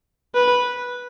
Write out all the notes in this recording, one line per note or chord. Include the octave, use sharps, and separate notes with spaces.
B4